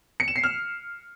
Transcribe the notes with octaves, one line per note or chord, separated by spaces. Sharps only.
C#7
E7
C7
F6